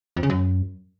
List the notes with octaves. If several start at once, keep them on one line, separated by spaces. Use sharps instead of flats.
F2
C#3
F#2